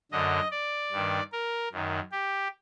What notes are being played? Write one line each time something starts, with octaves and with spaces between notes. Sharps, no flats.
F#2 D3 D#5
D5
G2 D#3
A#4
F#2 D#3
G4